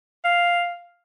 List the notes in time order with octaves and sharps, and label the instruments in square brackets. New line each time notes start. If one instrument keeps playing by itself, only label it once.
[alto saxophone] F5